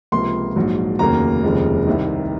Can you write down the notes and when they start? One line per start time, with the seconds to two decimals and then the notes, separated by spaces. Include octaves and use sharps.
0.12 C#2 C3 F3 A#3 C6
0.56 A#1 G#2 F#3
0.99 F1 D#2 C#3 F#3 A#3 A#5
1.43 F1 D#2 C#3 F3 G#3
1.86 C2 C3 D#3